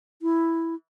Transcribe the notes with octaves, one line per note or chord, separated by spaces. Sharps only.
E4